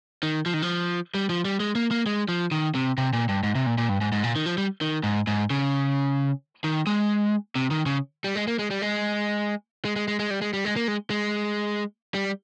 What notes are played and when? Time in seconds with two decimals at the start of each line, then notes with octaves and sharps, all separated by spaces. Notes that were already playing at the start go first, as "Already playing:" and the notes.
0.23 D#3
0.46 F3
0.54 D#3
0.62 F3
1.14 G3
1.30 F3
1.45 G3
1.60 G#3
1.75 A#3
1.91 A#3
2.06 G#3
2.28 F3
2.52 D#3
2.75 C3
2.98 C3
3.13 A#2
3.29 G2
3.43 G#2
3.55 C3
3.66 A#2
3.78 A#2
3.89 G2
4.01 G#2
4.12 G#2
4.24 A#2
4.36 D#3
4.46 F3
4.58 G3
4.81 D#3
5.03 G#2
5.27 G#2
5.50 C#3
6.64 D#3
6.87 G#3
7.55 C3
7.71 D#3
7.86 C#3
8.24 G3
8.36 G#3
8.47 A#3
8.59 G#3
8.71 G3
8.82 G#3
9.85 G#3
9.96 G#3
10.08 G#3
10.20 G#3
10.30 G3
10.42 G#3
10.53 G3
10.65 G#3
10.76 A#3
10.88 G#3
11.10 G#3
12.14 G3